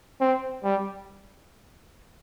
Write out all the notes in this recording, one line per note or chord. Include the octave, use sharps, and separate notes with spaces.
C4
G3